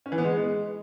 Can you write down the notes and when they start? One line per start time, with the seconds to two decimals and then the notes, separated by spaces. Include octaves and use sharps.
0.06 C#4
0.12 E3
0.18 B3
0.24 G#3